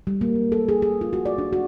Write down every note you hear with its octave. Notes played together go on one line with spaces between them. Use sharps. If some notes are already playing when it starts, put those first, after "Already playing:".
G3
A#3
G#3
A4
G#4
G#4
F4
F#4
D5
D4
F#4